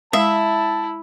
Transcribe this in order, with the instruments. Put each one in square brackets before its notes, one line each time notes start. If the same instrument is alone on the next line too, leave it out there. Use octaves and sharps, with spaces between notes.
[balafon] G#3 F5 [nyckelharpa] E4 [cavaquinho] E5 [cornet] A5